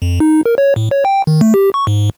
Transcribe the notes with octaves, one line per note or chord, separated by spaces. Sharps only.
F2
D#4
A#4
C#5
A2
C#5
G5
D#3
A3
G4
C#6
G#2